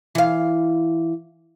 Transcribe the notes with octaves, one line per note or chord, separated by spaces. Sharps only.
E3 F5